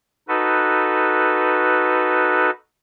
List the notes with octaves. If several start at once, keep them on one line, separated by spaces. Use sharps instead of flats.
D#4 F#4 A4 B4